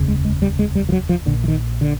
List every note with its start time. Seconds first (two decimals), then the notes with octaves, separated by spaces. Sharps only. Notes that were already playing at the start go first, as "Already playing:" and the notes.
Already playing: F1 D#2 C#3
0.08 G#3
0.25 G#3
0.42 G3
0.59 G#3
0.75 G3
0.89 F3
0.92 F#3
1.09 F3
1.26 A#1 A#2 D3
1.44 E3
1.48 D#3
1.81 D3